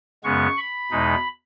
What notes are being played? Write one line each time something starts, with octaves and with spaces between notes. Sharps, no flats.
F#2 C#3 G#3 B3 C#6
B5
E2 B2 G#3 D#4